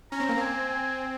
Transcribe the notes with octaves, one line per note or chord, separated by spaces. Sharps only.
C#4 A#5
C4
A#3
C4 G#5
G#5